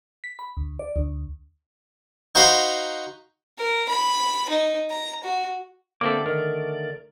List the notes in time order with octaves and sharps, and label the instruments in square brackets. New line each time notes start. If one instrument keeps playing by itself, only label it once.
[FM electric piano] B6
B5
D2
D5
D2
[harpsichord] D#4 F#4 C5 F5 A#5 B5
[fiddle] A#4
B5
D#4
A#5
F#4
[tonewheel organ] D3 A3 D5 [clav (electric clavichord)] A#3 C4 A4 [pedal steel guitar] E5 D6
[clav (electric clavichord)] D#3 [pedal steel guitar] A#4